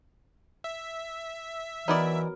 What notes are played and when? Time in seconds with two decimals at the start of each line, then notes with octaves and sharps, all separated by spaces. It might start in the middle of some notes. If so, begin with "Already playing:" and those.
0.64 E5
1.88 E3 F#3 B3 D#4 E4 A#4 D5